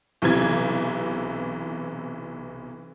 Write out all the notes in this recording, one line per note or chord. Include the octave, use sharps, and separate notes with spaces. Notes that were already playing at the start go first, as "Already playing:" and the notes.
B1 C3 E3 G#6